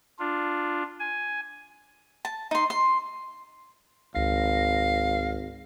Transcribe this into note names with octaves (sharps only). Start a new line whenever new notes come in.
D4 F4
G#5
A5
D#4 C6
C6
G#1 C#2 F5 A#6